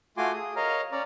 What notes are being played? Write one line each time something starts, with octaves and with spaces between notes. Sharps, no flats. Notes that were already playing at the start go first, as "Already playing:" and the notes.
A3 F4 F#4 G#5 C6 D6
G#4 D#6
A#4 C#5 D#5 F5 A#5 F6
C#4 C#5 D5 A#5